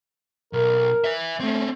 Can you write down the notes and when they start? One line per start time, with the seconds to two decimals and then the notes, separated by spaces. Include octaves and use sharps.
0.53 B1 A#4
1.04 B4 E5
1.40 A3 C4 C#4